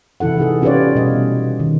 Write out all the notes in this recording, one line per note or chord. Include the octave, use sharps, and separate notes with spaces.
C3 E3 E4 A4 F#5
D#4 G#4 A4
C#4 F4 G4 B4 C#5 D5
B2 G3 D#5
D#3